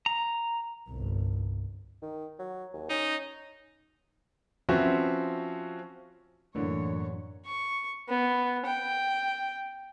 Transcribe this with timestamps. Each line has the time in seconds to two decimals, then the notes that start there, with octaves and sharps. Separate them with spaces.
0.06 A#5
0.88 G1 C2
2.02 D#3
2.39 F#3
2.73 D#2
2.90 C#4 D#4
4.69 F3 C4 C#4 F#4 B4 E5
6.55 F#2 A2 D3 E3 A#3 C#5
7.46 C#6
8.09 B3
8.66 G5